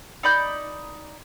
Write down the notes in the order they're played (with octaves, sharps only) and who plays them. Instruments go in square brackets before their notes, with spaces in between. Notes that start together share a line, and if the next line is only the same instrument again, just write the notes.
[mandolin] D#4 D5 B5 G6